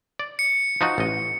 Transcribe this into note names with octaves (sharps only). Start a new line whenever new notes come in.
D5
C#7
F3 D#4 F#4
A1 D#5